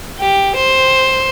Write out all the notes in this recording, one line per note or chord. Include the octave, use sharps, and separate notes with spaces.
G4
C5